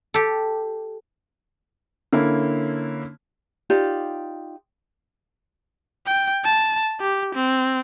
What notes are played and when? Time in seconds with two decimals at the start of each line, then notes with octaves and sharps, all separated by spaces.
0.14 G4 A4
2.13 D3 A#3 C#4 E4
3.70 D#4 F4 G4 D5
6.07 G5
6.45 A5
7.00 G4
7.35 C4